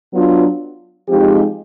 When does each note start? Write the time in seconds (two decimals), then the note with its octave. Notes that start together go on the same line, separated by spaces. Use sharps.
0.12 F#3 B3 D4 F4
1.08 F3 G#3 C4 D#4 G4